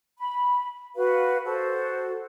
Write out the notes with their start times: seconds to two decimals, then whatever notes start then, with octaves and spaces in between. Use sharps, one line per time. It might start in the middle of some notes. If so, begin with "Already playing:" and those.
0.18 B5
0.96 F#4 B4 F5
1.45 F#4 A4 C5